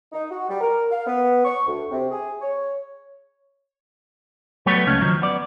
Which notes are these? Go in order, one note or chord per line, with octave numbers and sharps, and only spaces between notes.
D#4
F#4
G3
A#4
F5
B3
C#6
D2
C3
G#4
C#5
F#3 G3 A3 B3 B4 C#5
C#2 A3 C#4
D#3 F3 F#3
B3 D5